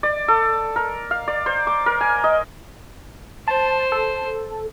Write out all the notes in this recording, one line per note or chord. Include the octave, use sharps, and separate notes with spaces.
D5
A4
A#4
F5
D5
C5
D6
A#4
G#5
D#5
C5 A5
A4